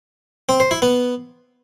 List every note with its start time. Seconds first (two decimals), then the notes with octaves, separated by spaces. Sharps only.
0.49 C4
0.60 C5
0.71 E4
0.82 B3